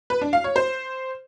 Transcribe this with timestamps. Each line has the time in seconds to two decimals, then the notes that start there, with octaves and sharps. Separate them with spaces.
0.10 B4
0.21 D4
0.33 F5
0.44 C#5
0.56 C5